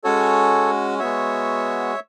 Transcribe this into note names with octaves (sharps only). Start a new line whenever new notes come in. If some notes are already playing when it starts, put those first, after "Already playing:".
G#3 C#4 F#4 A4 C#5
G#3 B3 F#4 C#5 E5